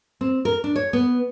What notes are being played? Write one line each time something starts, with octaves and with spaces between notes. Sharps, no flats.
C4
A#4
D4
C#5
B3